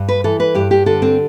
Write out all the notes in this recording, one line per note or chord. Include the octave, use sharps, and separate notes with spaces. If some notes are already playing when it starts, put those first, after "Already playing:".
Already playing: G2
B4
E3 A4
B4
G2 G4
G4
D3 A4
C4